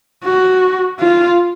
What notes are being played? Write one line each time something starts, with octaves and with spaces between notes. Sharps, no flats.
F#4
F4